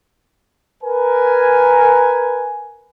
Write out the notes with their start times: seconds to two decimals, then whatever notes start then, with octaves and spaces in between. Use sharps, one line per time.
0.83 A#4 B4 G#5